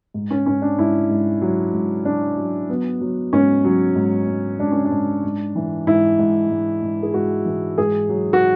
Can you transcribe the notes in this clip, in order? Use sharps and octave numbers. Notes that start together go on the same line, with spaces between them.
G#2
C#4
G#2 C#4
D4
G#2 E4
G#2
F#3
G#2
F#3 D4
F#3
F#3 B3
F#3
G#2 C#4
F#3
G#2
G#2
G#2 D4
C#4
D4
G#2
G#2
E3
G#2 E4
G#2
G#2
G#2
G#4
G#2 F#4
E3
G#2 G#4
F#3
F#4